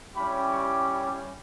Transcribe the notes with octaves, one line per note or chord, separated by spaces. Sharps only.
G3 C#4 E4 G4 B5
C#6